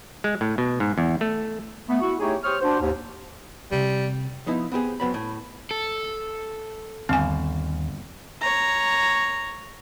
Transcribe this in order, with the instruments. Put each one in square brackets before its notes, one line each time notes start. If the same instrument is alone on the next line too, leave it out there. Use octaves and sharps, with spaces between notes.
[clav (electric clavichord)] G#3
A2
B2
G#2
E2
A3
[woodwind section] A3 B3
E4 F#4
A3 D#4 E4 G4 G#4 C#5
G4 C5 C#5 C#6 D#6 F6
D4 F#4 C5
D#2 G#2
[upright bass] C3 [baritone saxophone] G3
[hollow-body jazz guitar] F3 B3 D#4 E4
B3 C4 G4 G#4
F#2 F#3 B3 C4 B5
A2
[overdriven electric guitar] A4
[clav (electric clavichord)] G1 F5 [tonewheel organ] D#2 [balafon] C4 G#5
[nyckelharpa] C#5 A#5